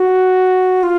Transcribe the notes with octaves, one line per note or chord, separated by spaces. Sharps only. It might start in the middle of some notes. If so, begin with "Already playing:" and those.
Already playing: F#4
F4